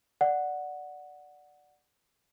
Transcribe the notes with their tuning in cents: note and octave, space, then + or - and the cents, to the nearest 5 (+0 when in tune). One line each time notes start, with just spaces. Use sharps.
D5 +0 F#5 -5